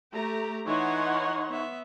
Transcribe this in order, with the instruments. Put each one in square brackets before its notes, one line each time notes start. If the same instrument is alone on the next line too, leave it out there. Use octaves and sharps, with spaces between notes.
[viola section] A3 A#5 [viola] G4
[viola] E3 G#5 [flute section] D#4 C#6 [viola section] C#5 F#5 C6
[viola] B3 E5